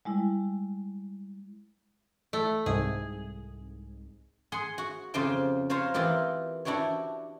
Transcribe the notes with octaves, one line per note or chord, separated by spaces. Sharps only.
G3 G#3 E4
A3
C2 G#2 G#4
G#4 F#5 C6
F#4
F2 C#3 F4 G4 C5 G5
F4 C5 C#5 F5 A#5
E3 E4 F4 G4 A#4
D4 E4 F#4 G4 C#5